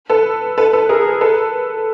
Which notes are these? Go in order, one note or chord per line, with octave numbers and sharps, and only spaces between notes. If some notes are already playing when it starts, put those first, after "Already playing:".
A4 B4
A4 B4
A4 B4
G#4 A#4
A4 B4